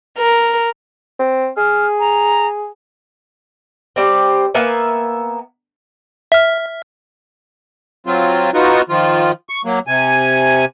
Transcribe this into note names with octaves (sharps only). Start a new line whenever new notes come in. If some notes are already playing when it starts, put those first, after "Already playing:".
A#4
C4
G#4 F6
A#5
G3 C4
A#3 B3 E5 G#5
E5 F6
F#3 C4 F4
B3 D#4 F4 F#4
D#3 F3 F4
C#6
F#3 A#3
C3 G#5